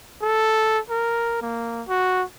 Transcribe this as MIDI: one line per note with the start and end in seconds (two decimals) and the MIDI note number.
0.22 0.79 69
0.90 1.37 70
1.42 1.82 58
1.88 2.24 66